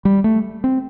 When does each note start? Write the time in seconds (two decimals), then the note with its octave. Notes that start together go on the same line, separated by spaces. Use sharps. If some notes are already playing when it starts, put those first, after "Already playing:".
0.05 G3
0.24 A3
0.64 C4